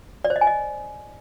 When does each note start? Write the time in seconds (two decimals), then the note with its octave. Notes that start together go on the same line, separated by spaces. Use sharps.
0.25 D5
0.30 C5
0.36 D#5
0.41 G#5
0.47 D#5